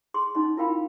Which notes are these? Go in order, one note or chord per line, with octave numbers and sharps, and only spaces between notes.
G#4 C6
C#4 D#4 D#5 C6
E4 F4 A#4 F5 G5 B5